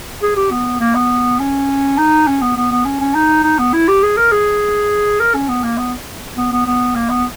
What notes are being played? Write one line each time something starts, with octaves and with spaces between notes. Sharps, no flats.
G#4
G4
B3
A#3
B3
C#4
D#4
C#4
B3
B3
B3
C#4
C#4
D#4
D#4
B3
E4
G4
G#4
A#4
G#4
A#4
C#4
B3
A#3
B3
B3
B3
B3
A#3
B3